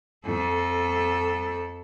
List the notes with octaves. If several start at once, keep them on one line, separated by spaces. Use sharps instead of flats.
F2 A4